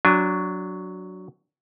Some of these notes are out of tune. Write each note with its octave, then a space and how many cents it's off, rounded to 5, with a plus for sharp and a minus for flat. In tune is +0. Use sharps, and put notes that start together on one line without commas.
F#3 +0 D4 -15 G#5 -20